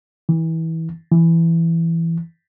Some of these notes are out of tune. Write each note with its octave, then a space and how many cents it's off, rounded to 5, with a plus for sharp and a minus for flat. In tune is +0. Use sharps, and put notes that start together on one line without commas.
E3 -25
E3 +10